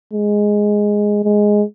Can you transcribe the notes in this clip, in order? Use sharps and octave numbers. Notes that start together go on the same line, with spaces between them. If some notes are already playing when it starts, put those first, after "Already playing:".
G#3
G#3